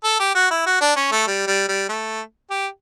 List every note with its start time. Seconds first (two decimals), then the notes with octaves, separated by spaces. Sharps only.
0.04 A4
0.20 G4
0.35 F#4
0.51 E4
0.66 F#4
0.81 D4
0.96 C#4
1.12 A3
1.27 G3
1.47 G3
1.69 G3
1.89 A3
2.50 G4